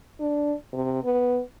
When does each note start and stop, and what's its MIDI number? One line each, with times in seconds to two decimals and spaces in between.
0.20 0.54 62
0.73 1.00 48
1.04 1.41 59